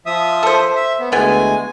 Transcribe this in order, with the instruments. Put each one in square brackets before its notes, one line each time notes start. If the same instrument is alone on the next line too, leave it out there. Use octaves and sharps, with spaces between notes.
[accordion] F3 E5 D#6
[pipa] A4 C5
[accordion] E5
B3
[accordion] D2 G#3 G#5 [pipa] E3 B3